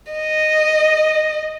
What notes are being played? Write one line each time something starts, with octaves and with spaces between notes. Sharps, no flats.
D#5